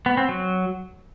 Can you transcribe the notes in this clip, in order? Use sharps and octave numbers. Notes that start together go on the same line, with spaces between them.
B3
C4
F#3